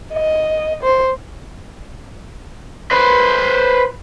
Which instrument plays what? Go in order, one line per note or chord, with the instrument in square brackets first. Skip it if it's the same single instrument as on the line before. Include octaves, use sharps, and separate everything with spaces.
[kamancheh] D#5
C5
[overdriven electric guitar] B4 C5